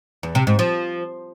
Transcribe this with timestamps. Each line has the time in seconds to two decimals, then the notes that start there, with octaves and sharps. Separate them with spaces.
0.23 E2
0.35 C3
0.47 G#2
0.59 F3